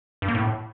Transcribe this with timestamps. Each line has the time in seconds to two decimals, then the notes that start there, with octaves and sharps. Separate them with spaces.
0.22 G2
0.28 A#3
0.35 A2